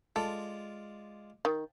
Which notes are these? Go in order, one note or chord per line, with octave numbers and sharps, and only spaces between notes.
G#3 F4 A4 D5
D#3